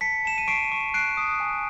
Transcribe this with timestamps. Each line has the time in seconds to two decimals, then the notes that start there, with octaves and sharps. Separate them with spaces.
0.01 A5 B6 C#7
0.25 A5 E7
0.38 D#7
0.48 C#6 C7 D7
0.72 C#6
0.94 F#6 C7 D7
1.17 D#6
1.40 G#5